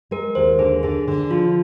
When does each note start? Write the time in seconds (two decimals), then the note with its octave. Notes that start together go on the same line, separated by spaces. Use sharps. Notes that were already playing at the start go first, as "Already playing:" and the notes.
0.11 G#3 A#4
0.35 D#2 C5
0.59 D3 G#4
0.83 D3 G#4
1.08 D3
1.31 F3 F4